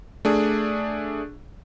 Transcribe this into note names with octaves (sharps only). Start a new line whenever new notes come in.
A3 D4 G#4